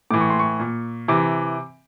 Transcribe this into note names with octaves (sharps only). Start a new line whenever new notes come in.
A2 E3 D6
C#6
C6
C#6
A#2
C3 E3 D6